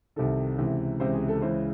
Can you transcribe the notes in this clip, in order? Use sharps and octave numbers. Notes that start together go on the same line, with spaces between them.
C2 C3 D#3 A4
C#2 C3 E3
C#2 C3 E3 C5
G#4
A4
C#2 C#3 E3 C5